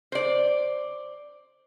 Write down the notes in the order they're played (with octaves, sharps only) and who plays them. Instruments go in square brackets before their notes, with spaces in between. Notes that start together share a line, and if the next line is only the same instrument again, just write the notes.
[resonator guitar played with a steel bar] C5 D5